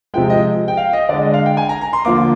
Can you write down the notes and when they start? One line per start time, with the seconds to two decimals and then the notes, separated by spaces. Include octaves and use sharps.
0.14 C3 F3 G#3 G5
0.30 D#5
0.68 G5
0.77 F5
0.93 D#5
1.09 D3 G#3 D5
1.22 D#5
1.34 F5
1.46 G5
1.57 G#5
1.69 A#5
1.81 A#5
1.93 C6
2.05 D3 F3 A#3 D6